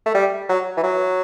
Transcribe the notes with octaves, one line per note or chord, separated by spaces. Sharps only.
A3
G3
F#3
E3
F#3